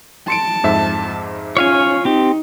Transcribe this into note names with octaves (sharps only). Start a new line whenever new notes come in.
A5 C6 C#7 D7
F2 G#2 E5
C#4 F4 C#5 F5 G#5
C4 D#4 G4